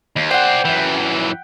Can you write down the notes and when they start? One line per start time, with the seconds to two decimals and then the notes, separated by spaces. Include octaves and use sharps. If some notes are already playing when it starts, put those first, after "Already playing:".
0.16 D#2
0.31 C5 D5 F#5 G5
0.65 F#2 E3